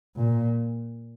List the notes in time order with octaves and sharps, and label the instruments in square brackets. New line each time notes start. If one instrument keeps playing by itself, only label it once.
[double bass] A#2